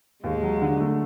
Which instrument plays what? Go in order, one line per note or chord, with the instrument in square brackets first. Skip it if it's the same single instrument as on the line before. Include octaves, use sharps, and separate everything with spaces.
[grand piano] D#2 [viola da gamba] G#3
[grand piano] F#3
D3
A3